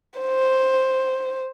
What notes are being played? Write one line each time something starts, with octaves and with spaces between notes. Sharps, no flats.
C5